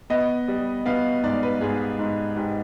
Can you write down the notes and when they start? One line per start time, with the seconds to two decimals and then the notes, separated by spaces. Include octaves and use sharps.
0.10 B3 D#5
0.48 G3
0.86 B3 F5
1.23 G#2 D5
1.43 B4
1.61 G#2 G#4
1.99 G#2
2.36 G#2 G4